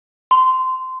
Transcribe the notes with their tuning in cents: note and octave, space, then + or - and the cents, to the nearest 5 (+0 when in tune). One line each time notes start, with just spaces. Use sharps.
C6 -20